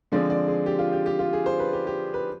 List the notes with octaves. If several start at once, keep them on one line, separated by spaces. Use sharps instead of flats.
D3 F3 G#3 C4 D5
D5
G#4
G4
F4
G4
G4
F4
G#4
C5
B4
G4
G4
B4